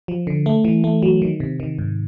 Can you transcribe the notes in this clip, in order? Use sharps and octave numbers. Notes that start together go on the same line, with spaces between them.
F3
D3
A3
E3
A3
F#3
D#3
C3
D#3
G#2